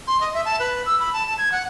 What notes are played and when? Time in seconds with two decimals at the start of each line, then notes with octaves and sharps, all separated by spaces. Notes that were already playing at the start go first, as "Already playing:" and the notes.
0.07 C6
0.21 D#5
0.34 E5
0.45 A5
0.59 B4
0.86 E6
1.00 B5
1.13 A5
1.27 A5
1.38 G#6
1.52 F#5